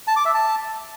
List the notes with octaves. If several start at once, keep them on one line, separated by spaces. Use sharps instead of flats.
A5
D6
E5
A5